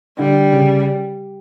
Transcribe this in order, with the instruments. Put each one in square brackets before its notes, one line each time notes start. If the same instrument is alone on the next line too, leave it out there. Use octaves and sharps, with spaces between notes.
[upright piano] D3 [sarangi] G3
[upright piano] C#3